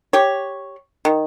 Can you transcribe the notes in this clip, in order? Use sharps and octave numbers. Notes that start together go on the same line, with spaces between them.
G4 C#5
D#3